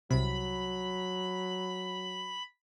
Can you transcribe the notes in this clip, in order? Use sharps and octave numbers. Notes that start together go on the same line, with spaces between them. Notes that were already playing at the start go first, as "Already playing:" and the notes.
C2 C3 F#3 B5